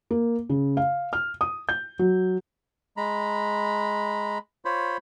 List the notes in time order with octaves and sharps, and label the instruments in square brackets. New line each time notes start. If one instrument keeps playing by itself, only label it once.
[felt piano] A#3
C#3
F5
F6
D#6
G6
F#3
[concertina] G#3 A#5 B5
F4 C5 C#5 B5